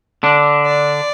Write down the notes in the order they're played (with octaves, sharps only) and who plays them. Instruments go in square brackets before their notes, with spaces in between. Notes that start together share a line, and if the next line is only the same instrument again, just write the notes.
[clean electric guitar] D3 D4
[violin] D5